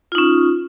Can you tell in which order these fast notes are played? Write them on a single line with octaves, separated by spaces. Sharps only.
F4 D#4 C#4